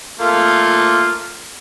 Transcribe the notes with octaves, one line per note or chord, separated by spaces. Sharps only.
A3 A#3 F4